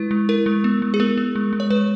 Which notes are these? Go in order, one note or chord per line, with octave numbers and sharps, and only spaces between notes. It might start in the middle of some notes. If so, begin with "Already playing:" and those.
Already playing: G#3 E4 B4
G#3
E4 A#4
G#3
B3
G#3
G#4
B3 A#4
B3
G#3
G#3
C#5
G#3 B4